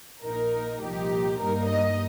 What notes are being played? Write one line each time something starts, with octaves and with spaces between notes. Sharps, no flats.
A#1 A#2 A#3 D#4 A#4
C2 A#2 F3 D#4 G4
G2 G3 A#3 D#4 A#4
D#5